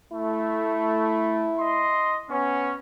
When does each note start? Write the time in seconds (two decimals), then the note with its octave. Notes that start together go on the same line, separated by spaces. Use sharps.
0.12 A3 E4
1.59 D#5 C6
2.30 B3 C#4